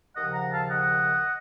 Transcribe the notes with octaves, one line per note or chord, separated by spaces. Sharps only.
D#2 C#3 F3 D#5 F#5
F#5 A#5
F5 A5
D#5 F#5